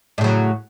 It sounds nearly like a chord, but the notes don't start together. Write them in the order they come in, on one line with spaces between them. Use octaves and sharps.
A2 C#3 F#3